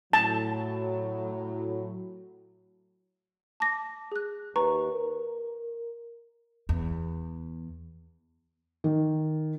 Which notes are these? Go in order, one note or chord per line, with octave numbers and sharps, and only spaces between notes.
A2 F#3 A5
A5 D6 A#6
G#4 F#6
D#2 B4 A#5 C#6
A#4
E2
D#3